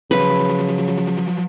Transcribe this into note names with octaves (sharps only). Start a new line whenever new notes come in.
C#3 F3 F#3 B4